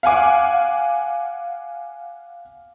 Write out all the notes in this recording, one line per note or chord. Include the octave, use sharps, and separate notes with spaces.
F5 F#5 G#5 D6